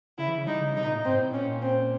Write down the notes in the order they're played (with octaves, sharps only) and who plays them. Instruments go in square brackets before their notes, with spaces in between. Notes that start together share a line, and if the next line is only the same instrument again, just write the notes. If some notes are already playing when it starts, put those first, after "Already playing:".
[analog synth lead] C#3 [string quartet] E4
[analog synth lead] E3
C#3
[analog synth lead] G3 [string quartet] D#4
[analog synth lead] C#3
[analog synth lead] C3 [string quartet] D#4
[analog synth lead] A#2
A2
[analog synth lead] G#2 [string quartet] C4
[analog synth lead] A2
[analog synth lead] A#2 [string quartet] C#4
[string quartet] C4